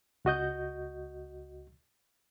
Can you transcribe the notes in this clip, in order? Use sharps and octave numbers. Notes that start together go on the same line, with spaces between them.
C#2 F#4 D#5 G6